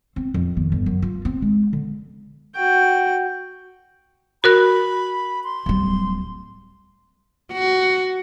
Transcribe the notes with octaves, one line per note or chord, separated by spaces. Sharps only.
C4
F2
D#3
G1
F#2
F4
C4
G#3
D3
F#4 G5
F#4 A#4 B5 F#6
C6
D1 G3
F#4